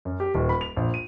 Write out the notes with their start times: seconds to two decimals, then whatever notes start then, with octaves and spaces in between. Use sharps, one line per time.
0.05 F#2
0.20 G4
0.34 D#1
0.49 B5
0.61 F7
0.76 A#1
0.94 D#7